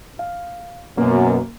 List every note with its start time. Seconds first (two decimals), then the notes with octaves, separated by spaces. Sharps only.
0.19 F5
0.98 F#2 B2 A#3